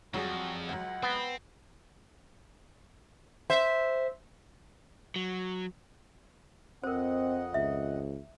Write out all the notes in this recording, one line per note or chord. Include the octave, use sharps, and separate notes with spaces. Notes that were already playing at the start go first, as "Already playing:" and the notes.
F2 F#3 G3 F#4 G#4
C#2 F#3 F#5
B3 C4
C5 E5
F#3
F2 C4 A#4 C5 D#5 F#5
C#2 E5